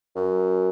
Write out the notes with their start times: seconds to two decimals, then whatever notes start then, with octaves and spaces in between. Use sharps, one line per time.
0.16 F#2